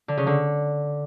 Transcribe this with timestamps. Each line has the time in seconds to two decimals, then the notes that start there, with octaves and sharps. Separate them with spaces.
0.08 D3
0.17 C#3
0.27 D3